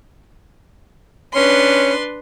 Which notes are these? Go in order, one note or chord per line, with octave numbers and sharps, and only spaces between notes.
C#4 D4 B4 C6